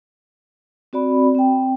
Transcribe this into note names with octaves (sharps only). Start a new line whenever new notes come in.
C4 F#4 D5 B5
C4 G5